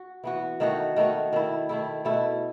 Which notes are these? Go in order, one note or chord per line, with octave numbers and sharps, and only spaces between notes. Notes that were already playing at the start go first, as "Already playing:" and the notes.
Already playing: F#4
E3 B3 F#4
D#3 A3 D#4 F#4
D#3 A3 D#4 F#4
D#3 A3 E4
D#3 A3 E4
B2 A3 E4